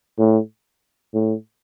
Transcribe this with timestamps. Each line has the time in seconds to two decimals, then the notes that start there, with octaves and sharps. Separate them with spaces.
0.19 A2
1.14 A2